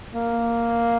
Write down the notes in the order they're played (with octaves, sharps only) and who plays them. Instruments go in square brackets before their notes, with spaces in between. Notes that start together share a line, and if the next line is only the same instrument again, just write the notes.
[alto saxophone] A#3